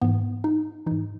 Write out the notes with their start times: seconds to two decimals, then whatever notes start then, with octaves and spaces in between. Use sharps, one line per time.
0.02 G#2 E3 B3
0.44 D#4
0.86 G#2 E3 D#4